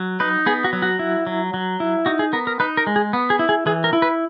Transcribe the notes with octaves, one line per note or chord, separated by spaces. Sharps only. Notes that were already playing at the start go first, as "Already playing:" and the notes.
Already playing: F#3
D#4 B4
B3 G#4
F#4
F#3
F#4
E4
F#3
F#3
E4
D#4 F#4
G#4
B3 A#4
A#4
D#4 B4
A#4
G#3
G#4
B3
G#4
E4
G#4
E3 G#4
A#4
E4
B4